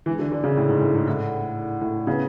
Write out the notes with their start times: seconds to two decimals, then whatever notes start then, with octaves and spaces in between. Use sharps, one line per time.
0.06 E3 G#3 D4 G#4
0.19 D3
0.32 D3
0.44 C#3
0.57 A2
0.68 G#2
0.81 A2
0.95 G#2
1.06 A2 E4 A4 D5 F#5
1.81 A2
2.07 C#3 B3 E4 B4